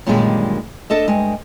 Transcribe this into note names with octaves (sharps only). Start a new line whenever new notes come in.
F#2 A#2 D3 D#3 G3 G#3
D4 A4 D#5 E5
G2 G#3 D#5